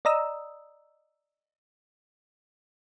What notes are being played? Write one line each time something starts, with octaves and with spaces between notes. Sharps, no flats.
D5 D#5 A#5 D#6 E6